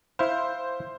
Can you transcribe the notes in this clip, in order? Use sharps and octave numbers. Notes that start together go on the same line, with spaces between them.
E4 C5 E5 F5